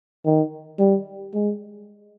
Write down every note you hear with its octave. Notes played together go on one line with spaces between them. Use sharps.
D#3
G3
G#3